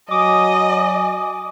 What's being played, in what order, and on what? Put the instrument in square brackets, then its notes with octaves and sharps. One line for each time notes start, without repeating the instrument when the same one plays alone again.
[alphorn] F#3 [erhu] D#5 [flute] G#5 [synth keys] D6 D#6